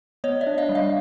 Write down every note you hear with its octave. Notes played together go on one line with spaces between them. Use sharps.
B3 C#5 D#5
D5 E5
D4
D#5 F5
G3
D#5 F5